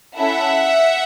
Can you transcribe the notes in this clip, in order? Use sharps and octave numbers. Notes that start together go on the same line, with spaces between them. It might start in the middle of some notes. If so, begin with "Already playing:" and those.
C#4 E4 A4 E5 F#5